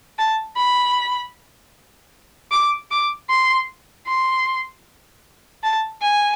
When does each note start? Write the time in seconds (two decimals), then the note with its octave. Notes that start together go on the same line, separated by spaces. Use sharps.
0.19 A5
0.57 B5
2.52 D6
2.91 D6
3.29 C6
4.07 C6
5.63 A5
6.02 G#5